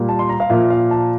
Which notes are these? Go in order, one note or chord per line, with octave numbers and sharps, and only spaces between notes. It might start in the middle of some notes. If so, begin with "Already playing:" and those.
Already playing: A#2 G3 A#3
A5
C6
A#5
F5
A#2 F3 A#3 E5
F5
A5